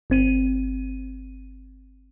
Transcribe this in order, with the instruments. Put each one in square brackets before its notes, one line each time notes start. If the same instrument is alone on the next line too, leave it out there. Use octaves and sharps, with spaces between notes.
[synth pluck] G1 C4 D#7